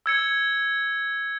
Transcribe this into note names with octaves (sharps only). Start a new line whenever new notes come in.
E6 G#6 C#7